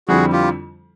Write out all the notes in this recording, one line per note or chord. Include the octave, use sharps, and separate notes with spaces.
F2 D3 G3 C4 E4 F#4 G#4
F4 G4